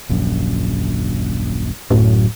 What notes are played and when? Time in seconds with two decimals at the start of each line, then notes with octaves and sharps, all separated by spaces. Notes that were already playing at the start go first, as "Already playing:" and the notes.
0.09 D#1 A#1 F#2
1.91 D1 F#2 A2 F#3